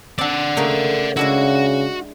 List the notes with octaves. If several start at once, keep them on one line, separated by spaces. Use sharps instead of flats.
C4 D4 D5 F#5
C#3 A3 A#3
C#3 G#3 D4 E4 F#4